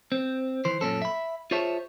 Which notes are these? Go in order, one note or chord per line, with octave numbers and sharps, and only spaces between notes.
C4
E3 C5
F#2 A#2 C#4 A4
E5 B5
F4 G#4 C5 C#5 E5 A5